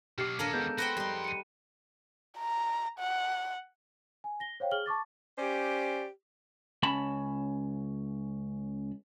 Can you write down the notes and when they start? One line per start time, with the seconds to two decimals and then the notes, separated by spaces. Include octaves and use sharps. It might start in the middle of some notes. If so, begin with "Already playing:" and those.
0.18 B2 F#3 G4 D6 F6 C7
0.39 A#1 D#2 A#3 C#4 A4 A#4
0.53 G#3 B3 G6
0.78 F#4 B4 C5 G5 A#6
0.97 F2 G3 D#4 C6
1.24 C#7 D#7
2.39 A#5
2.99 F#5
4.24 G#5
4.40 A#6 G7
4.60 C5 C#5 F5 G5
4.71 G#4 F6 F#7 G7
4.86 A5 C#6 D6 A6
5.38 C#4 G4 C5 D5
6.83 C#2 C#4 A5 B5